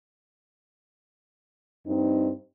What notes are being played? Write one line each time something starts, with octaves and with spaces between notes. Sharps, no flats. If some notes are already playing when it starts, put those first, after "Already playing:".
G2 C4 D#4